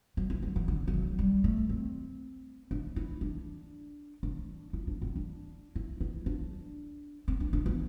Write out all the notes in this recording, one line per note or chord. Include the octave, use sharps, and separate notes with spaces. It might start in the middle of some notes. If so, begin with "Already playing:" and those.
F#3
E3
D3
E3
D3
E3
F#3
G3
A3
C4
D4
E4
D4
D4
E4
D4
C4
D4
E4
E4
D4
C4
D4
D4
B3